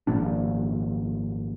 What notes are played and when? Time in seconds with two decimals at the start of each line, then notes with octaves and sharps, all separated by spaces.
0.07 G#1 A#2 F3 D4